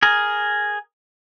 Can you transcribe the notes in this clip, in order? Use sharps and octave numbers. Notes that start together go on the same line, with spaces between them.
G#4 A#4